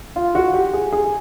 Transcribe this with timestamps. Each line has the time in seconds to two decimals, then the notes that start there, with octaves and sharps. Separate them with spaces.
0.16 F4
0.35 F#4
0.53 G4
0.74 G#4
0.93 G#4